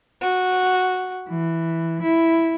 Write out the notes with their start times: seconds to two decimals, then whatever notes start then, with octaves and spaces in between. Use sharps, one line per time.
0.21 F#4
1.28 E3
2.03 E4